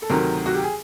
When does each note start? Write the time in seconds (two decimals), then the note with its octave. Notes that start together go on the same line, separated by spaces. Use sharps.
0.02 A4
0.09 D2 C3 D#3 F#3 A#4
0.46 F#4
0.55 G4
0.63 G#4